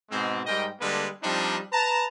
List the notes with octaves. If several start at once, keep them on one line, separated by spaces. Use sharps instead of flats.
G#2 B2 G#3 C4
G#2 G3 A#4 D#5 G5
D3 G3 G#3 A#3 A4 B4
F3 G3 C4 D4 D#4
B4 A5 A#5